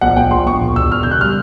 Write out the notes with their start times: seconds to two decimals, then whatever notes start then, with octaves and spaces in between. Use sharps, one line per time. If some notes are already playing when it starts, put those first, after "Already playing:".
0.01 A#1 F#5
0.16 A#1 G5
0.31 A#1 C6
0.46 A#1 C#6
0.61 E1
0.76 E1 E6
0.91 E1 F6
1.03 C#3 G6
1.11 F#6
1.21 G3 F6